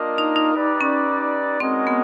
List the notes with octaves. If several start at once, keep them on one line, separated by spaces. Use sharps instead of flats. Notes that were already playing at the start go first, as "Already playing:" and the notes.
Already playing: A#3 D4 F4 A#4 D#5
D#4
D#4
D#4 G4 B4 D5
C#4
G#3 C4 C#4 F#4 A#4 D#5
B3